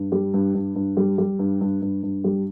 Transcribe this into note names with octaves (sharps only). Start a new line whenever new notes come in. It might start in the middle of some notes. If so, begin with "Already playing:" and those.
Already playing: G2
G3
G2
G2
G2
G3
G3
G2
G2
G2
G2
G3